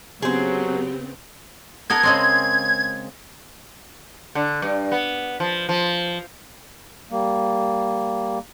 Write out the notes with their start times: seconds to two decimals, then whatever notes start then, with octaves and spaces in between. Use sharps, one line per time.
0.22 C#3 F#3 B3 C4 G4 G#4 C5
1.90 B3 A4 A#4 G#6
2.03 C#3 G#3 C4
4.35 D3
4.62 G2
4.92 B3
5.40 F3
5.69 F3
7.11 G3 A#3